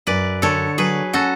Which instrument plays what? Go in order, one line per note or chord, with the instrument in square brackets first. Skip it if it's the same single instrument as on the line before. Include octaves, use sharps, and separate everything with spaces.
[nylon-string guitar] F#2 [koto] B4 D5
[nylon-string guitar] D3 [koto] A4 C#5
[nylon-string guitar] F#3 [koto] G#4 B4
[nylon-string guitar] C#4 [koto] F#4 A4